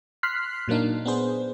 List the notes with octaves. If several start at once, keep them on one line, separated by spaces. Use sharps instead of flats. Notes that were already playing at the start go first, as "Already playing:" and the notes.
C6 F6 F#6 B6 C7
A#2 F#3 A#3 D4 D#4
B3 D4 G#4 C5